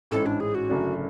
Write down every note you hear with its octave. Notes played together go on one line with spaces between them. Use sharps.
A1 G#2 G#3 C#4 E4 A4
D4
G#4
F#4
F#1 F#2 D3 A3 D4